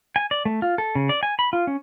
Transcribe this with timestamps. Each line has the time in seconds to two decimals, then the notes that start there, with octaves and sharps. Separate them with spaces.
0.16 G#5
0.31 D5
0.45 A3
0.62 F4
0.78 A4
0.95 C#3
1.09 D5
1.23 G#5
1.39 B5
1.53 F4
1.67 C#4